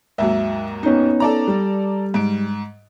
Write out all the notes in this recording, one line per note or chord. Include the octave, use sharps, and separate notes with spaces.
D#2 G#2 F#3 E5
B3 C#4 D#4
A4 D5 A#5
G3
G#2 D7